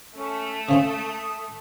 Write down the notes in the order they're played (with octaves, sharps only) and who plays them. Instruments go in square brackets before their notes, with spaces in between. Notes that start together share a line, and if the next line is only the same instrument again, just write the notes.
[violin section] A3 [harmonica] C#4
[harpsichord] C#3 C4 C#4 [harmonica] D#6